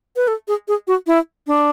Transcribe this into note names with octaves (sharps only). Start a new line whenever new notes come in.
B4
A4
G#4
G#4
F#4
E4
D4